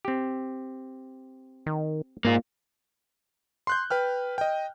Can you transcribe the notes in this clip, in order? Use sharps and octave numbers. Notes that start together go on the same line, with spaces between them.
C4 G4
D#3
G#2 A#3 F4
C6 F#6 G6
B4 G5 F6
D#5 G5